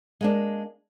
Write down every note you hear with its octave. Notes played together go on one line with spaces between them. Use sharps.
G#3 A#3 D4